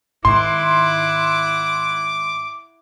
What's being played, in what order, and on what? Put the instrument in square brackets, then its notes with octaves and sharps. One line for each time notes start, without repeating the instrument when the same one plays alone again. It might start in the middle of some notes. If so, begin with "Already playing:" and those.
[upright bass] G#2 D#3 [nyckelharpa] E4 F#5 [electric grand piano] C6 [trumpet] D6